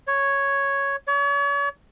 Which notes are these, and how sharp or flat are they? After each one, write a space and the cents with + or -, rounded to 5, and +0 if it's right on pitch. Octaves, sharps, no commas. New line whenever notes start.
C#5 +0
C#5 +40